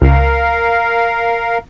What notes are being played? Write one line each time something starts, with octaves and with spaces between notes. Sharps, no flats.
C#2 A#4 F5